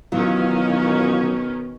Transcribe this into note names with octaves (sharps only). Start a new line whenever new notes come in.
B2 D#3 E3 F#3 C#4 F4